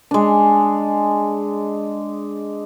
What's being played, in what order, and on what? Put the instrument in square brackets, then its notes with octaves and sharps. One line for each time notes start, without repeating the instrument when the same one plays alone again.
[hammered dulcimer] G#3 D4